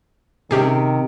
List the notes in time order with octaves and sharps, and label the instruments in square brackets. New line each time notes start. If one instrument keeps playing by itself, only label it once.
[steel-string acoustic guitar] C3 [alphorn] D#3 [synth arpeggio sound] C#4 G4 G#4